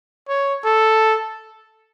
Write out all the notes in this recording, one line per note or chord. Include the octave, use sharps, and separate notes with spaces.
C#5
A4